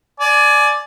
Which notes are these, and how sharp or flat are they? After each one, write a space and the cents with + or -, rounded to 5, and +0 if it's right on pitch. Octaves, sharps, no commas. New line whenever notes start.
D5 +0 G#5 +25